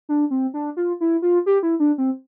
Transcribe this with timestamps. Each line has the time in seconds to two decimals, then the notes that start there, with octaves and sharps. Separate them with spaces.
0.09 D4
0.31 C4
0.54 D4
0.77 F4
1.01 E4
1.22 F4
1.46 G4
1.63 E4
1.80 D4
1.98 C4